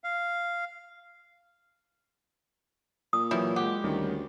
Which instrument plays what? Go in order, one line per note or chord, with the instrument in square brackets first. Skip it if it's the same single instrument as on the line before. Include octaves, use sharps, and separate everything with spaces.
[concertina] F5
[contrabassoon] A#2 [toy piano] D#6
[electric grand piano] E3 F#3 C#5 [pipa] G3 E4
[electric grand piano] G#3 F#5 [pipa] G4
[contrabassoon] D2 [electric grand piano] D#3 G3 C#4